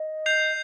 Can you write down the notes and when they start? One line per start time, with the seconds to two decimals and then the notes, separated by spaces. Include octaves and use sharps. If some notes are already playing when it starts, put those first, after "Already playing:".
Already playing: D#5
0.26 G6 C7 F7